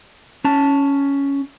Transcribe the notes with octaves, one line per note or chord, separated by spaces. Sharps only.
C#4 A5